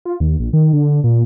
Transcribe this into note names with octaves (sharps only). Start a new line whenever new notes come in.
F4
D#2
A#1
D#3
D3
A#2